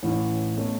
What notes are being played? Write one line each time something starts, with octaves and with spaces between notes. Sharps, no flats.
A1 A2 E3 C#4
B2 A3 C#4